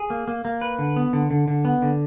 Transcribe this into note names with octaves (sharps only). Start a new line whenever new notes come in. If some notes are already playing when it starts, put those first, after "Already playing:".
Already playing: G#4
A#3
A#3
A#3
B4
D3
B3
D3
D3
D3
B3
D3